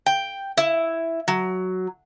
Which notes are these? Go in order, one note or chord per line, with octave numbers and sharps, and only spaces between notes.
G5
E4
F#3